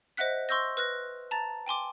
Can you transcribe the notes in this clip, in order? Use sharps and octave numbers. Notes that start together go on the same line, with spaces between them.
C5 D#5 E5 F#5 F#6 B6
C6 C#6 E6 G6 A#6
B4 F6 F#6 A#6
A5 A#5 A6
G5 G#5 C6 D6